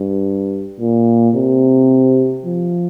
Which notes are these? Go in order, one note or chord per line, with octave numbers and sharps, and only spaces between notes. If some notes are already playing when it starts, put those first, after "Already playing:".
Already playing: G2
A#2
C3
F3